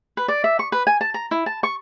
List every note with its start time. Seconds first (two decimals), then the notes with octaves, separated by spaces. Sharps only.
0.17 B4
0.28 D5
0.44 E5
0.59 C#6
0.72 B4
0.87 G#5
1.01 A5
1.14 A#5
1.31 E4
1.46 A5
1.63 C#6